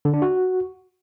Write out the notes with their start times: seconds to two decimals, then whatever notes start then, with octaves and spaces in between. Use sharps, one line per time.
0.05 D3
0.14 D4
0.22 F#4